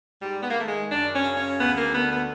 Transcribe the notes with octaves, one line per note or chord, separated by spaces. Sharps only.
G#2 G3
B3
A#3
D#3 A3
G#3
F#2 D4
C#4
C#3
C#4
D2 B3
A#3
D3 B3
B3